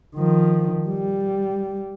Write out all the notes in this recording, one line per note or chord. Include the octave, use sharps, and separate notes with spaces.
D#3 F3
G3